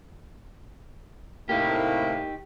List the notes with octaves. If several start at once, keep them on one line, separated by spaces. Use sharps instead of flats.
A2 C3 A#3 D#4 G4